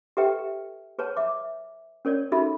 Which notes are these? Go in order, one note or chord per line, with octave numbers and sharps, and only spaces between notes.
G4 A4 B4 E5 G5
G#4 B4 C#5 A5
E5 D6
C#4 A#4 C#5 D5
D#4 F#4 G#4 A4 E5 B5